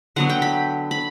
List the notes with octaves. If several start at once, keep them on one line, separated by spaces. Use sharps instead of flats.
D3 F#3 B3 F#5
G5
B5
B5